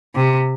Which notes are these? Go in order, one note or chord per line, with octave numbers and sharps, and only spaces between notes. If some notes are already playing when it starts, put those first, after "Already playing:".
C3